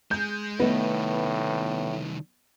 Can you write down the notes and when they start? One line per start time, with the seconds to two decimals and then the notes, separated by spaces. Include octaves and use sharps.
0.11 G#3 G6
0.60 C2 A2 D#3 A3 B3 B4 D#5